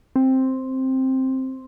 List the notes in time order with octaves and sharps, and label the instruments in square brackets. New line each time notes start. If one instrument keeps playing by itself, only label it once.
[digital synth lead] C4